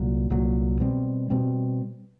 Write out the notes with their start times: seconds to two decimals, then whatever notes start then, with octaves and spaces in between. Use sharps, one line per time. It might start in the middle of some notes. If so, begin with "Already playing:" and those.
Already playing: C2 A#2 F#3
0.30 C2 A#2 F#3
0.80 B2 G3 C4
1.30 B2 G3 C4